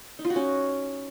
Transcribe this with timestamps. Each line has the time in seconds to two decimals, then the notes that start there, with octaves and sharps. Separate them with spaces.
0.19 D#4
0.25 F4
0.30 F#4
0.36 C#4